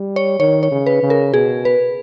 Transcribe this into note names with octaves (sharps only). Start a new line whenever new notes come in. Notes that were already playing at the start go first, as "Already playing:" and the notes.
Already playing: G3
C#5
D#3 C#5
C#5
C#3
B4
C#3
A#4
B2 G#4
B4